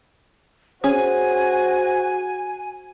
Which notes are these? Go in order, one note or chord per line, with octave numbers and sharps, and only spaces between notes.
C#4 F#4 G#4 C5 G#5